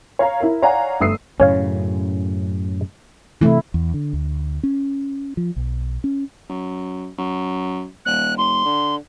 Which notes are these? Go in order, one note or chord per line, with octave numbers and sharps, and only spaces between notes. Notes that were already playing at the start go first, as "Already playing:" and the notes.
C#5 F5 A#5
E4 A#4
C#5 D5 F5 F#5 G#5 A#5
G1 A3 D#6 E6 C7
F#2 A2 C#3 C#4 C#5 F5
C3 E3 A3 E4
E2
D3
D2
C#4
F3
B1
C#4
F#2
F#2
D#1 F#6
F1 C6
D3